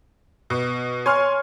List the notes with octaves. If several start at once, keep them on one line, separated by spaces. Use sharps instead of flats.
B2
C#5 G#5 C6 F6